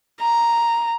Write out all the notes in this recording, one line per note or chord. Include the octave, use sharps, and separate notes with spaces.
A#5